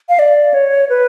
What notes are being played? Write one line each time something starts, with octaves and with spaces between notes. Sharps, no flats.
F5
D5
C#5
B4